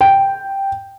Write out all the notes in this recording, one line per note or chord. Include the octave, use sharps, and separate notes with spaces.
G5